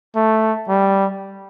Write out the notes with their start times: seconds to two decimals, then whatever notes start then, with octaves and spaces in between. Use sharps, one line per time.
0.15 A3
0.69 G3